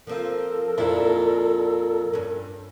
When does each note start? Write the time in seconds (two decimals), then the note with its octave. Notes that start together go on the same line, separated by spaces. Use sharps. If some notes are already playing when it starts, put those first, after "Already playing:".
0.07 F3 C4 F4 A4 A#4
0.78 F2 A#2 D4 E4
2.13 G2 C#4